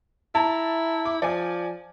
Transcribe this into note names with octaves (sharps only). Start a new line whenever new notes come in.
E4 A5 A#5
D6
F3 D5 G#5